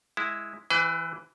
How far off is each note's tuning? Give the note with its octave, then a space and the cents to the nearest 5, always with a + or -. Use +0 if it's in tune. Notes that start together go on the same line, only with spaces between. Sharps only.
G#3 +0 E4 +0
E3 +0 G4 +0 B4 +45